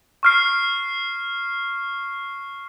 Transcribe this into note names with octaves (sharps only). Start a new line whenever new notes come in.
C#6 F6 C7